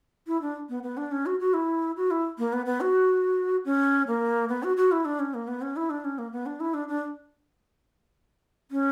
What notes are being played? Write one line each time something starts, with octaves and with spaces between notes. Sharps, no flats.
E4
D4
B3
B3
D4
C#4
F#4
F#4
E4
F#4
E4
A#3
B3
B3
F#4
C#4
A#3
B3
F#4
F#4
E4
D4
C#4
A#3
B3
C#4
E4
D4
C#4
A#3
B3
D4
E4
D4
D4
C#4